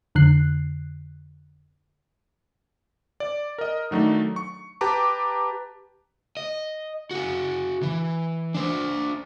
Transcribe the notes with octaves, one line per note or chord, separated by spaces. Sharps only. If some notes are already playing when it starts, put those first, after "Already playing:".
F2 D3 F#6 C7
D5
A#4 D#5
D#3 F#3 A3 D4 D#4
C#6
G4 B4 A5 A#5 D6
D#5
F#4 G#4
E3
D4 C5